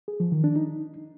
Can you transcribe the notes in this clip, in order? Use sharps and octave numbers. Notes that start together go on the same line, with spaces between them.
G#4
F3
D#3
D4
D#4